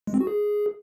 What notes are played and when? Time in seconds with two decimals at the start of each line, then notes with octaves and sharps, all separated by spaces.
0.07 G#3
0.14 C4
0.21 F#4
0.27 G#4